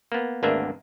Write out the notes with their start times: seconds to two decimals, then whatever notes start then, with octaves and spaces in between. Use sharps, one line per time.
0.12 A#3 B3
0.43 G#1 D2 A#3 B3 D4 E5